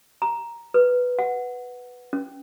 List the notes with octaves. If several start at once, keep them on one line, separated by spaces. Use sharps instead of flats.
A#5
B4
F#5
C#4